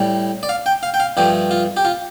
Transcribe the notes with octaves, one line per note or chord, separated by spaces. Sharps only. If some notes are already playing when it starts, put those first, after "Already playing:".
Already playing: A2 G3
D5
F5
G5
F5
G5
F5
G2 F3 A3 G4
F4
G4
F4